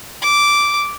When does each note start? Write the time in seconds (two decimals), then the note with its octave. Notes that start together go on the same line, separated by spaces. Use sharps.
0.22 D6